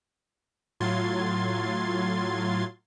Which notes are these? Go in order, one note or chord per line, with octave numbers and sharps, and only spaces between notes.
A2 F#3 F4 C6 G#6 A6